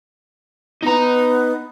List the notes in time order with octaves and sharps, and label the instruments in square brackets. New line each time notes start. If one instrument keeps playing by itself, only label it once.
[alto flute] B3 [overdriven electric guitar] D#4 A#5